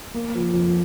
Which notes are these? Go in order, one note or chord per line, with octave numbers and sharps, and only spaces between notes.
A#3
F3
F2